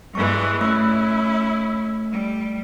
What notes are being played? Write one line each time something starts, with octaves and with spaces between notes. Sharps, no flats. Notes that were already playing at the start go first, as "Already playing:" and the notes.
G2 E3 G#3 C#6
A3 C#4 E4 B5 E6
G3